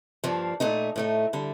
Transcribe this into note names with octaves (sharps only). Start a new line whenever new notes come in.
G2 F3 A#3 D4
A#2 A3 D#4
A2 A3 D#4
D3 G3